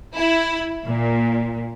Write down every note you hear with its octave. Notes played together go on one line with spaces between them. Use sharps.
E4
A#2